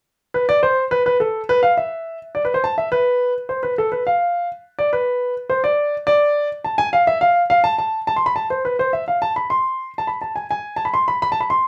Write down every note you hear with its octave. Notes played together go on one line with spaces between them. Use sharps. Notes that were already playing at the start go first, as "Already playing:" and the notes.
B4
D5
C5
B4
B4
A4
B4
F5
E5
D5
B4
C5
A5
E5
B4
C5
B4
A4
B4
F5
D5
B4
C5
D5
D5
A5
G#5
F5
E5
F5
F5
A5
A5
A5
C6
B5
A5
C5
B4
C5
E5
F5
A5
B5
C6
A5
B5
A5
G#5
G#5
A5
B5
C6
B5
B5
A5
B5
C6